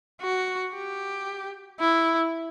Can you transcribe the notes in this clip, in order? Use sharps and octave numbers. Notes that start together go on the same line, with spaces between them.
F#4
G4
E4